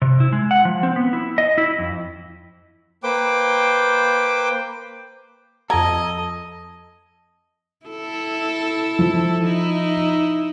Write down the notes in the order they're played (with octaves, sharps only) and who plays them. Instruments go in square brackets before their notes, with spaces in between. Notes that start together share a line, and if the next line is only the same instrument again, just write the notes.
[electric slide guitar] C3
E4
G#3
F#5
F3
C4
B3
E4
D#5
E4
F2
[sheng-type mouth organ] A#3 B4 C5 G5 D6
[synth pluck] F2 G#6 [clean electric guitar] A4 [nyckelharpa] D#5 [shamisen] A#5
[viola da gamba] E4 A4
[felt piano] F3
[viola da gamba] D#4 E4